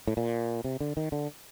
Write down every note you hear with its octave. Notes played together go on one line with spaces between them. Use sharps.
A2
A#2
C3
D3
D#3
D3